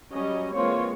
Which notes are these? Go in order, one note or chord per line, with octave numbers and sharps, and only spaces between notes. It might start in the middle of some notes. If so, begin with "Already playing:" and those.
F#3 G3 C#4 D#5
E3 G#3 A#3 C4 F4 C#5